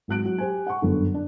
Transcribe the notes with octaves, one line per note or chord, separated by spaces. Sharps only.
G#1 F#3 F#6 D7
F#3
G4 C5 G#5
F#5 C#6
G1 F#2 D3
D4